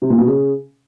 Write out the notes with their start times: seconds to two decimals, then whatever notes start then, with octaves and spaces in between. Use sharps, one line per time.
0.02 C3
0.10 A#2
0.18 B2
0.27 C#3